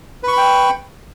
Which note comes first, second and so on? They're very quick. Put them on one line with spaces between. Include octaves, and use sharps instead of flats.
B4 C#6 B5 G5